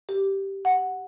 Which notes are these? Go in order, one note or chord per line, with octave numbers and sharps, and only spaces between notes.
G4
F#5